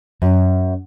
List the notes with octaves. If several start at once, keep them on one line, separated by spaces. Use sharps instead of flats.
F#2